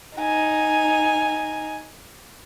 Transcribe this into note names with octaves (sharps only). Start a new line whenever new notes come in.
D#4 G#5